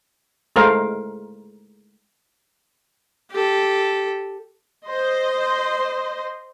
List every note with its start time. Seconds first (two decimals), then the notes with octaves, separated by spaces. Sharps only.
0.56 G#3 A3 A#4 C5 F5
3.31 G4 A4
4.86 C5 D#5 C6